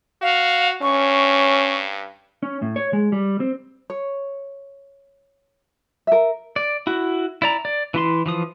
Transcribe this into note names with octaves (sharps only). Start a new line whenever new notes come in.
F#4 F5
G2 C#4 C#6
C#4
A2
C#5
G#3
G3
C4
C#5
A#4 E5
D5
E4 F#4
E4 D5 A#5
D5
E3 E4 C6
E3 F3 D#6